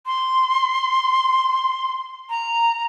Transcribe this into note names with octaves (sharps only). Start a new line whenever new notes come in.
C6
A#5